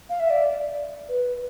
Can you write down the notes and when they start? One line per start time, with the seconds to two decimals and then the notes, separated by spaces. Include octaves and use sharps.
0.10 F5
0.20 E5
0.30 D5
1.09 B4